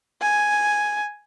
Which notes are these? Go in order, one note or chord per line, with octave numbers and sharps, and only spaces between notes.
G#5